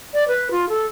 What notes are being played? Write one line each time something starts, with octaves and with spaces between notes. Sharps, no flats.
D5
B4
F4
A4